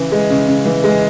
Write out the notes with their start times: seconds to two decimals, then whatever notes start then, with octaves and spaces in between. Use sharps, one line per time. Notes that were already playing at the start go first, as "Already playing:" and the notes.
Already playing: C#3 E3
0.12 G#3
0.30 C#3
0.48 C#3
0.65 E3
0.84 G#3